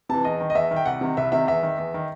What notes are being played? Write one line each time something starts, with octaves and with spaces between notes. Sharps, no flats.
C3 E3 A5
E2 D#5
D#3
D#5
E2 E5
D#3
G5
C2 F#5
C3 D#3
C2 E5
C3 D#3 E5
E2 E5
D#3
E2
D#3